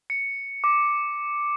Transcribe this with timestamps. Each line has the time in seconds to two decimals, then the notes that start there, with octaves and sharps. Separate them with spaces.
0.10 C#7
0.64 D6